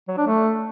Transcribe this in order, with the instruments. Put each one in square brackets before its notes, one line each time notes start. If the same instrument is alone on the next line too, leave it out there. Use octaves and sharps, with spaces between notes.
[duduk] F#3
D4
A3